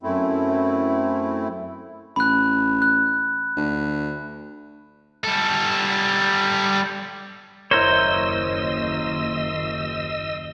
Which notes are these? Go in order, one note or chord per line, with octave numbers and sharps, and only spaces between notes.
F#2 A3 C4 E4
A1 B5 F#6
F#6
D2
G3 A4
F#1 D#2 E4 A#4 C5 C#5 D#5 E6